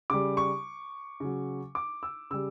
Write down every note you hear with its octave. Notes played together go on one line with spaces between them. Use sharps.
C#3 G3 D6
C#6
C#3 F#3
D6
E6
C#3 G3 E6